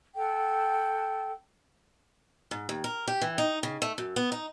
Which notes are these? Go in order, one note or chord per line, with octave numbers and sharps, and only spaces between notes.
A4 F#5 G5
G#2
D#2
A#4
G4
E3
D#4
C#3
A3
F#2
B3
D#4